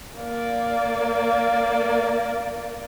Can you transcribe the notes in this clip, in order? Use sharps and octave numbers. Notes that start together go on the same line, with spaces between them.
A#3 D5